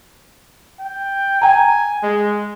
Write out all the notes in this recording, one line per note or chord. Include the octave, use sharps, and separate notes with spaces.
G5
G5 G#5 A#5
G#3